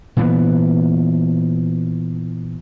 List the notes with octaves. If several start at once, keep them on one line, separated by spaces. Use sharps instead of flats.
A#2 E3 B3